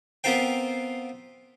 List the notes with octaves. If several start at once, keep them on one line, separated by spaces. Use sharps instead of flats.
B3 C4 F4 A#4 C5 G5